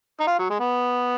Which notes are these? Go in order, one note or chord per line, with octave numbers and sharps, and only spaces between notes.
D#4
F4
F#3
G#3
B3